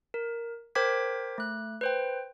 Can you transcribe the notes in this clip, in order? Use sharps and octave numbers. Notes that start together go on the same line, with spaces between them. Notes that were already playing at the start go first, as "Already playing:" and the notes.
A#4
A#4 C5 G5 D6 G#6 B6
A3 F#6
B4 C5 G5